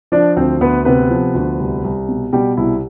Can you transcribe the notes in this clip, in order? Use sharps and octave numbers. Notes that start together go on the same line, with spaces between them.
F3 D4 D5
D2 C4 C5
D2 B3 B4
C3 B3 B4
F3
D2
C2
C2
B2
B2 G3 G4
C2 E4